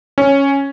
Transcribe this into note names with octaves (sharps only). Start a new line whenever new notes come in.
C#4